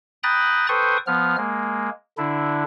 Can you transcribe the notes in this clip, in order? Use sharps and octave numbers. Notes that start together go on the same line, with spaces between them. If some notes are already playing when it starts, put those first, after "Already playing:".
G5 A#5 B5 D#6 F#6 A6
A4 B4 C5 G5 C#6 D#6
F3 B3 F6
G#3 A#3
D3 D4 E4